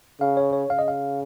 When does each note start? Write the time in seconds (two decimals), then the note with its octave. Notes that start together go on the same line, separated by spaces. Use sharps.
0.21 C#3 F5
0.37 C#5
0.53 C#5
0.70 C#3 F5
0.79 D#5
0.88 F5